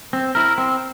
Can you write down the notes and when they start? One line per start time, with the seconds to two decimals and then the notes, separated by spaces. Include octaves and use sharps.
0.13 C4
0.35 E4 A#4
0.58 C4